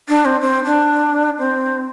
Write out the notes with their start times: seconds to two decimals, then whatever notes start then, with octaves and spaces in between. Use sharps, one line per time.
0.08 D4
0.25 C4
0.41 C4
0.65 D4
1.39 C4